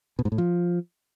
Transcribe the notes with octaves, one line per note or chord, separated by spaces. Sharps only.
B2
G#2
A2
F3